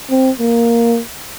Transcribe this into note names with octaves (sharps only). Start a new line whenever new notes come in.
C4
A#3